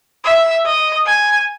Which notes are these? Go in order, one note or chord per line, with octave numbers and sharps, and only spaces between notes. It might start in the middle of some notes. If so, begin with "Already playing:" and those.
E5
D#5
G#5